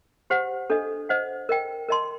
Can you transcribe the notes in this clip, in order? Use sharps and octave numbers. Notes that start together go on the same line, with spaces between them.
G4 C5 F#5
D4 A4 D#5
C5 D#5 F#5
A#4 D#5 G5
A#4 D#5 A5 C6